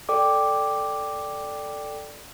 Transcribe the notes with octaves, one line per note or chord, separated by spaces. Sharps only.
A4 D5 G5 D6